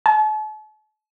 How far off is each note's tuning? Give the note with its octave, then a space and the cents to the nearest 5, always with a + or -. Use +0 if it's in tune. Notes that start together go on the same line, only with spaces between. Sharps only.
A5 -45